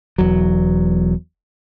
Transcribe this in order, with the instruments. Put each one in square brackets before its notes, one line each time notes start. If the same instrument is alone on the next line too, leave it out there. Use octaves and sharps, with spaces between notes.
[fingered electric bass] E1 E2 F#3